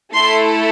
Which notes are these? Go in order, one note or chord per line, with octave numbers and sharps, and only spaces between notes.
A3 E4 A4 C6